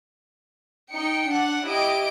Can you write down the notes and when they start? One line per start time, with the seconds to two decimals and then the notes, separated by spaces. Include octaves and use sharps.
0.92 D#4 G5 C#7
1.29 D4 F#5
1.67 E4 G4 D#5 D7